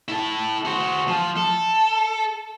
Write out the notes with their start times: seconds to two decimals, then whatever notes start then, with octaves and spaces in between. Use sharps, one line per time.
0.08 E4 A4
0.65 F#4 C5
1.08 F3
1.36 A4